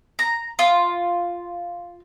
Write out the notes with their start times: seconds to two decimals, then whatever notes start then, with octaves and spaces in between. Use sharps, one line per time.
0.19 A#5
0.59 F4